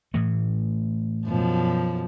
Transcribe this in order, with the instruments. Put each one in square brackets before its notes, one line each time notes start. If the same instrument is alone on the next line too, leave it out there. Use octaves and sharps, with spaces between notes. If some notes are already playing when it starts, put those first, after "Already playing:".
[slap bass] A2 E3 A3
[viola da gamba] F#2 B2 F3